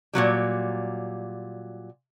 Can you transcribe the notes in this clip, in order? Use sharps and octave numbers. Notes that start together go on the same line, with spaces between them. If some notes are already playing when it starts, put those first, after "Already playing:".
A#2 C#3 F#3 G3